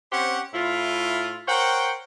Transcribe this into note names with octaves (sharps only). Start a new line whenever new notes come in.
C4 C#4 G4 C5 F#5
A2 E4 F4
A#4 C5 C#5 F#5 G5